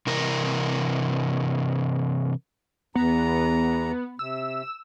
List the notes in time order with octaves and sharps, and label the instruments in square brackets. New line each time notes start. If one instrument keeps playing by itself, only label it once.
[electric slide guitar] C3 E3 A#4
[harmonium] E2 A#5 [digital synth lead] B3
[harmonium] C3 [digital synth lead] E6